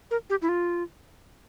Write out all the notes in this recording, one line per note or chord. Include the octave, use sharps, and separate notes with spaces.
A#4
G4
E4
F4